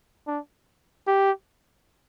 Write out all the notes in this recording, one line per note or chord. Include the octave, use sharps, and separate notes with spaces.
D4
G4